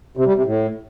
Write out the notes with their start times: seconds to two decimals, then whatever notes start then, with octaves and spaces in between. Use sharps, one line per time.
0.17 C3
0.27 G3
0.36 C3
0.45 A2